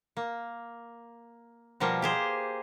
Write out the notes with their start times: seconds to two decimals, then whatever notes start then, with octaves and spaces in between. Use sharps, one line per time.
0.17 A#3
1.80 B2 F3 G3 A#3
2.02 G4 G#4 C5